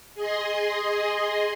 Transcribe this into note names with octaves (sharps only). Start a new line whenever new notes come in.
G#4 D#5 C6